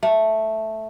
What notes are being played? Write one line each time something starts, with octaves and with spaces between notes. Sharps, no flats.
A3